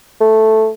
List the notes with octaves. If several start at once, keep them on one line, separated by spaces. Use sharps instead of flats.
A3